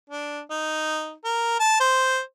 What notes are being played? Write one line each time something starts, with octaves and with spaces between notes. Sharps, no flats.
D4
D#4
A#4
A5
C5